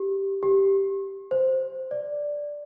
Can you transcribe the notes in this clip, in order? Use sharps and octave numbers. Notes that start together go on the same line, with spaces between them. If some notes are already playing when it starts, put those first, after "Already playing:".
Already playing: G4
G4
C5
D5